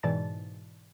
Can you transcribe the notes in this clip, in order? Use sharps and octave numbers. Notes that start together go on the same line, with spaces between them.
G#2 B2 E3 D5 A5 A6